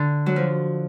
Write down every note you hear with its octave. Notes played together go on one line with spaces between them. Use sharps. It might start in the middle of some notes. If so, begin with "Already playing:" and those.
Already playing: D3
F#3
F3